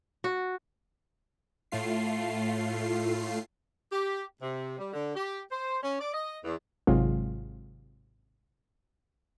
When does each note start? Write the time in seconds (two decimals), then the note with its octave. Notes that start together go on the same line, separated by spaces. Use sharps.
0.24 F#4
1.72 A2 A3 F4 C7
3.91 G4
4.41 C3
4.78 G3
4.93 D3
5.15 G4
5.51 C5
5.82 C#4
5.99 D5
6.13 D#5
6.44 E2
6.87 G#1 C3 F#3 G#3 F4